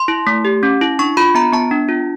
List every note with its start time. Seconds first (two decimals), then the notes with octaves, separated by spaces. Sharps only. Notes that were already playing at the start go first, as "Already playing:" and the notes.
Already playing: C6
0.08 E4
0.27 A3
0.45 G4
0.63 C#4
0.81 E4
0.99 D4 C#6
1.17 F4 B5
1.35 B3 A#5
1.52 B3 A5
1.71 D4
1.88 F4